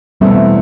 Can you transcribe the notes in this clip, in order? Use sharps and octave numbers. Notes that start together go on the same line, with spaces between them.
E2 B2 G3 A3 C4 E4